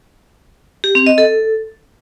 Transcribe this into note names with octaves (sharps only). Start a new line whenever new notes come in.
G4
C4
D#5
A4